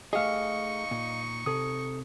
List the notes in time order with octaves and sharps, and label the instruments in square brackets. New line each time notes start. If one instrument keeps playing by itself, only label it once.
[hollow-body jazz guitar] A3 G4 G#4 [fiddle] D#4 C#6 [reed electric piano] D#5 F5
[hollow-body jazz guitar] A#2
[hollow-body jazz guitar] C3 [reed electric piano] A4 D#6